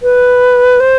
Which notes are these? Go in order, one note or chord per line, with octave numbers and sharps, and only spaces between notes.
B4
C5